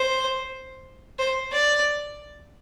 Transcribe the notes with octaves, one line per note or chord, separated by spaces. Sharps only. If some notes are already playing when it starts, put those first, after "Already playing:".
Already playing: C5
C5
D5